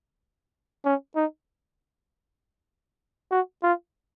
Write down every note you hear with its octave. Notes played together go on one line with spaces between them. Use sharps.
C#4
D#4
F#4
F4